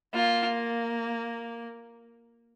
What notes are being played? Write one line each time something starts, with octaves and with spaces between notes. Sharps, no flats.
A#3 F4